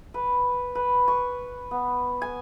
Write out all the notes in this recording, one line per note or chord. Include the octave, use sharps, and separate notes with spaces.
B4
B4
C#6
B3
G#5